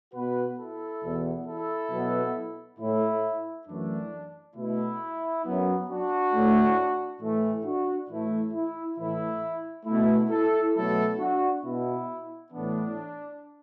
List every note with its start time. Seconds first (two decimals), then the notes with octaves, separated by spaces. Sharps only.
0.14 B2 B3 F#4 B4
0.58 E4 A4
1.02 E2 B2 B3
1.46 E4 A4
1.90 B2 F#3 B3
2.79 A2 A3 E4
3.67 F#2 E3 A3 D4
4.56 B2 A3 E4
5.44 F#2 F#3 B3
5.88 D4 F#4
6.33 A2 A3
7.21 A2 E3 A3
7.65 D4 F#4
8.09 A2 E3 A3 E4
8.53 E4
8.97 A2 E3 A3 E4
9.86 B2 A3 E4
10.30 E4 A4
10.74 B2 F#3 A3 E4 A4
11.19 D4 F#4
11.63 B2 B3 E4
12.51 A2 E3 B3 D4